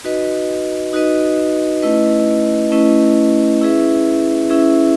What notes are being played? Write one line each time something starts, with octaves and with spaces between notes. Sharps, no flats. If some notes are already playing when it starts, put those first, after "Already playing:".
D#4 F#4 B4 D#5
D#4 F#4 B4 D#5
A3 C#4 E4 B4 D#5
A3 C#4 E4 B4 D#5
C#4 E4 G#4 B4 E5
C#4 E4 G#4 B4 E5